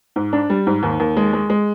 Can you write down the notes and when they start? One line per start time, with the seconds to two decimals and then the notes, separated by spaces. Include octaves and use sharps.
0.16 G#2
0.33 D4
0.50 G3
0.67 G#2
0.83 D#2
1.00 D#2
1.17 G#3
1.33 G#3
1.50 G#3